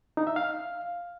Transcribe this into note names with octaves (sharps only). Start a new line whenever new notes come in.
D#4
E5
F5